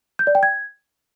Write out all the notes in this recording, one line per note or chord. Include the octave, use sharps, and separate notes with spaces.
G6
D5
G5
G#6